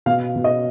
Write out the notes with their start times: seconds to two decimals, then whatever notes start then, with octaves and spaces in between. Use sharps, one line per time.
0.06 B2 F5
0.36 B2
0.44 D#5